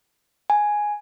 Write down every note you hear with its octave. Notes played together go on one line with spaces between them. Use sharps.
G#5